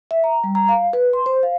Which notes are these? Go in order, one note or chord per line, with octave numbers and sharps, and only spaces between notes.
E5
A#5
G3
A#5
F5
B4
C6
C5
F5